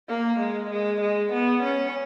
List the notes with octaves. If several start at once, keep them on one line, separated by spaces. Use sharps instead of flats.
A#3
G#3
G#3
G#3
B3
C#4